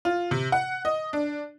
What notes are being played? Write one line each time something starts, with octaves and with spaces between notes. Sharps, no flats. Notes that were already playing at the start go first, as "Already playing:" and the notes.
F4
C3
F#5
D#5
D4